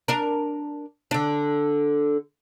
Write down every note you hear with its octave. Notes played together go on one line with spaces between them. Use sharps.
D4 A#4
D3 D4